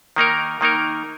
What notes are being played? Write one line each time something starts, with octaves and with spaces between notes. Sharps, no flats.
D#3 A#3 D#4 A#4
D#3 A#3 D#4 A#4